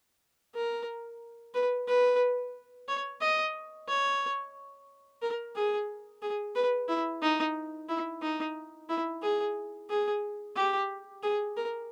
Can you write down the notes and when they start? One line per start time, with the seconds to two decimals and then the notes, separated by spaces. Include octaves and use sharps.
0.54 A#4
1.54 B4
1.88 B4
2.88 C#5
3.21 D#5
3.88 C#5
5.22 A#4
5.56 G#4
6.22 G#4
6.55 B4
6.89 E4
7.22 D#4
7.89 E4
8.22 D#4
8.89 E4
9.22 G#4
9.90 G#4
10.56 G4
11.23 G#4
11.57 A#4